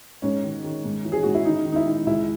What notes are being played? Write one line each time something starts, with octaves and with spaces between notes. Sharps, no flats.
G#2 C#4
D#3
D#3
G#2
E3
G#4
G#2 F#4
E4
D#3 D#4
D#3
D#4
E4
D#3
C#2 E4